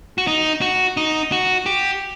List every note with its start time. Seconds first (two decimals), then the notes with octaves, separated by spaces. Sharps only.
0.18 F#4
0.27 D#4
0.61 F#4
0.97 D#4
1.32 F#4
1.66 G4